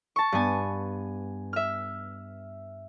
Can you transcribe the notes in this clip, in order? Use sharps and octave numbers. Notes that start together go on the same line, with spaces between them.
A5 C#6
G2 B3 G#5 A6
E5 F6